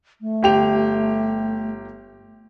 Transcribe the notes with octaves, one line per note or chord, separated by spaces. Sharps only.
A3
G1 G4 F7